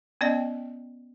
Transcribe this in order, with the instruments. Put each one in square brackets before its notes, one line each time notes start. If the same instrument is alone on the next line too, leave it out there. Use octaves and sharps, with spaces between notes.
[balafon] B3 C#4 D5 D#5 G5